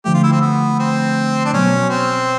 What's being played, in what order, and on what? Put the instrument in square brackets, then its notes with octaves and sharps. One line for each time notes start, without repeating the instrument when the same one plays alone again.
[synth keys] D3 F3 A3 [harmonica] G4
[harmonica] F4
E4
C4
B3
C4
D4
[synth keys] B2 F#3 B3 [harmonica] C#4
[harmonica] C4